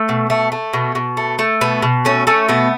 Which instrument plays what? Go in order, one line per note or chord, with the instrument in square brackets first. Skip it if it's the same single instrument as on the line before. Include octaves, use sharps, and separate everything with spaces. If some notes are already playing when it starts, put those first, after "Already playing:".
Already playing: [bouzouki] A3
B2
A3
A3
B2
B2
A3
A3
B2 B3
B2
A3 C#4
A3 C#4
B2 B3